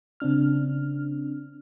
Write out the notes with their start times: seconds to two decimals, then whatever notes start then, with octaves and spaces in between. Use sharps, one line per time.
0.20 C#3 C4 D4 F6